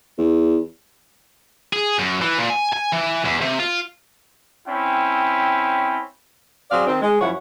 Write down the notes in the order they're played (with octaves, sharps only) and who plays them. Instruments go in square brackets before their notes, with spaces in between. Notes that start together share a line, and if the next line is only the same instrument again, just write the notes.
[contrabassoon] E2
[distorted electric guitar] G#4
F#2
E3
A#2
G#5
G#5
E3
E2
C3
F4
[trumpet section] C4 C#4 E4 G5
[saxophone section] F#3 C4 G#4 D5 F5
D#3 C4
G#3
F#2 F3 E4 C#5 F#5